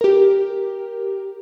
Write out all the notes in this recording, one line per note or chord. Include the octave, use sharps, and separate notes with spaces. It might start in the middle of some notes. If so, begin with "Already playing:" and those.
G4 A#4